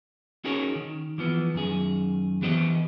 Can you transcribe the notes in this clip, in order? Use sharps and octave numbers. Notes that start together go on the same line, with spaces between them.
C#4 D#4 F#4 G#4 A#4 C#5
D#3
E3 F3 B3
F#2 D#3 G#4
E3 B3 G4 C5 D#5